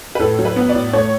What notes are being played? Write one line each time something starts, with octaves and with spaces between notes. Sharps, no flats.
B4
A2 A4
F#3
B4
B3
D5
A2
A3 C#5